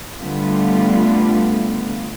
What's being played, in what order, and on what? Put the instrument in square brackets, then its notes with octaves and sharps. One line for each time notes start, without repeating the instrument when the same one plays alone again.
[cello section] D3 G3 A3 B3 F4